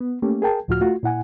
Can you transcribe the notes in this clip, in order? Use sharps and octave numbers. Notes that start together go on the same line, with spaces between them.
B3
A3 A#3 C#4 G4
G#4 A#4 G5 A5
C#2 A2 F3 F4 F#4 F6
A3 F4 F#4
A#2 E4 F#5 G#5